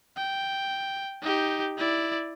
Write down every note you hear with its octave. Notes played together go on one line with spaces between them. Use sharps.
G5
D#4 G4
E4 D5